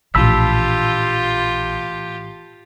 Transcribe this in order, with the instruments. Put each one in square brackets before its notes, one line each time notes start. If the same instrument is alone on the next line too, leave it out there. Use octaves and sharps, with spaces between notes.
[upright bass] A#1 [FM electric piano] A2 E3 [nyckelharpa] F4 G4 [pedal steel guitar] A5 B5 E6